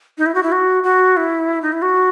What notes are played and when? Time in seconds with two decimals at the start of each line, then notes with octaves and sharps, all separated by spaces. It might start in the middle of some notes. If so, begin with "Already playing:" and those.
0.18 D#4
0.26 E4
0.35 F#4
0.43 E4
0.52 F#4
0.84 F#4
1.17 E4
1.62 D#4
1.72 E4
1.82 F#4